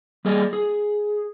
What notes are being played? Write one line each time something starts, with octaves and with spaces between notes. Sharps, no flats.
G3 A#3 G#4 D5 D#5
G#4